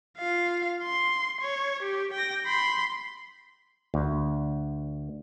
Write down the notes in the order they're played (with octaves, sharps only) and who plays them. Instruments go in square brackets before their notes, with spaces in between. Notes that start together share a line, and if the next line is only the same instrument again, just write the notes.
[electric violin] F4 F5
C6
C#5
G4
G5 A#6
B5 C6
[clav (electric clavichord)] D2